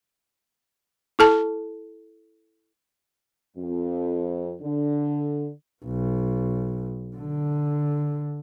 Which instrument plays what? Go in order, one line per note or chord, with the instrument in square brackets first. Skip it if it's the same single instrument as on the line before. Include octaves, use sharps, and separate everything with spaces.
[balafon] E4 A4 A5
[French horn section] F2
D3
[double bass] B1
D3